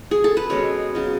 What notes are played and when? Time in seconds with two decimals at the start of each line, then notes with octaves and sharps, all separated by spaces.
0.11 G#4
0.24 A4
0.37 B4
0.50 B2 G#3 C#4 C#5
0.95 C#3 F#3 C#4